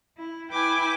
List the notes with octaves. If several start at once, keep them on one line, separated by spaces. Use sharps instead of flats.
E4
E4 B4 G5 G#5 D6